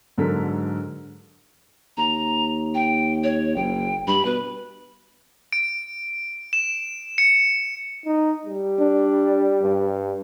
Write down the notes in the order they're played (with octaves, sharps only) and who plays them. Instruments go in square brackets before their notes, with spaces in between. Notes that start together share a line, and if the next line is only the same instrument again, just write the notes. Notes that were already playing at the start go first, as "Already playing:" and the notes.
[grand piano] G#2 D3 F#3 A4 A#4 B6
[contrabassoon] D#2 [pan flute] A#5
[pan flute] G5
C#5
[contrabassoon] F#1 [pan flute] G5
[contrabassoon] G2 [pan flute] B5
[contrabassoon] B2 [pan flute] B4
[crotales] D7
E7
C#7
[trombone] D#4
G3
[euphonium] D4
G2